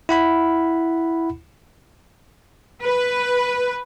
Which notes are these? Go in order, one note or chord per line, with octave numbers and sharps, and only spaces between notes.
E4 F#5 B5
B4